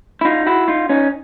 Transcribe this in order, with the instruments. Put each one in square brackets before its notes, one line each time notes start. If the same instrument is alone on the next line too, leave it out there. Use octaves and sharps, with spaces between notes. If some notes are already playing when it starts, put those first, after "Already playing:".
[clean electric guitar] E4
D#4 F4
E4 F#4
D#4 F4
C#4 D#4